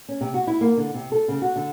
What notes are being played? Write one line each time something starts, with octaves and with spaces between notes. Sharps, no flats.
C#4
C3
F#4
E4
A#3
D3
C3
A4
C#3
F#4
D3